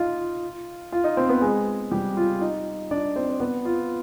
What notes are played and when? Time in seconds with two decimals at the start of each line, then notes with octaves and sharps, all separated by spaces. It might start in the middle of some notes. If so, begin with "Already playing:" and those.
Already playing: D#4 F4 F5
0.92 F4 F5
1.04 D#4 D#5
1.17 C4 C5
1.29 B3 B4
1.41 G#3 G#4
1.91 G3 G4
2.17 F4
2.41 D#4
2.91 D4 D5
3.16 C4 C5
3.30 C5
3.40 B3 B4
3.65 F4